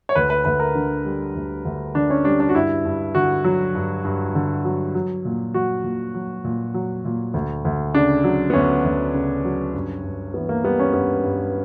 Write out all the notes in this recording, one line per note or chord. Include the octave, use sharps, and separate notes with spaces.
C#5
D2 B4
B4
D2 B4
A#4
D3
G3
D2
D2
D3 D4
C#4
G3 D4
D4
F#4
G2 E4
G2
D3 F#4
F#3
G2
G2
D3
F#3
F#3
A#2
F#3 F#4
A#2
F#3
A#2
F#3
A#2
D2
D2
C#3 D4
F#3
B3
D2 C#4
D2
C#3
F#3
G2
G2
E3 B3
A#3
G3 B3
C#4
G2 B3
G2